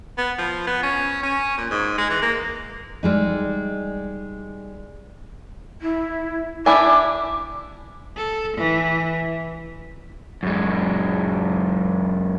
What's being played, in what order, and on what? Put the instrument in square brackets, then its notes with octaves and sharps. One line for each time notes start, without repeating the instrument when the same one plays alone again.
[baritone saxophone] B3
F3
B3
C#4
C#4
A#2
G#2
G#3
E3
A#3
[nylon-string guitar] G3 G#3 D#4
[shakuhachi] E4
[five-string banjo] D4 E4 G#5 [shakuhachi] D6
[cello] A4
E3
[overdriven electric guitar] F#2 G#3